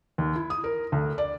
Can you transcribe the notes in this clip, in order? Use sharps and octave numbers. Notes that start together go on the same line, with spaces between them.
D#2
E4
D#6
A#4
D2
D5